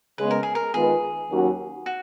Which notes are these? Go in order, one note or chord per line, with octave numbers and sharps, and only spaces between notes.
C#3 G#3 B3 B4
A#4
G#4
A#4
D#3 G#3 B3 F4 G#4 B4
D#2 D#3 F#3 C#4 F#4
F#4